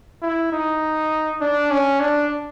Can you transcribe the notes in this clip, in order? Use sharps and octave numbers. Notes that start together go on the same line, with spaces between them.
E4
D#4
D4
C#4
D4